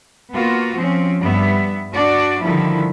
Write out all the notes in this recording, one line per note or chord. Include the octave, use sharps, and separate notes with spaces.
A#3 B3 F4 F#4
F3 C4 C#4
G2 G3 B3 E5
D4 F#4 D5
D3 D#3 F3 G3 E4